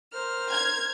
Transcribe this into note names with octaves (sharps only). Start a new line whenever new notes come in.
A#4 C5 F6
G#6